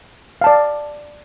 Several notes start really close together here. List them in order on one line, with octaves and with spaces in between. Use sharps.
F5 A5 D5